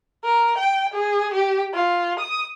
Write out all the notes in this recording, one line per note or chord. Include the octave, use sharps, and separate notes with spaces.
A#4
G5
G#4
G4
F4
D#6